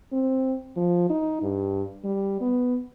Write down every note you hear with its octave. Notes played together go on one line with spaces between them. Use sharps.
C4
F3
D#4
G2
G3
B3